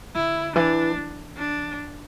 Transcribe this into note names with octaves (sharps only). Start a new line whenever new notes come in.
D3 E4
E3 D4
E3
D4